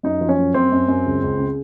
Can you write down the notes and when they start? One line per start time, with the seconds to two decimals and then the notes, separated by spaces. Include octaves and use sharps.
0.03 F#2 D#4
0.21 F3
0.29 C#4
0.38 F#2
0.54 F#2 C4
0.72 F#2
0.88 F#2
1.06 C#2
1.22 C#2
1.39 C#3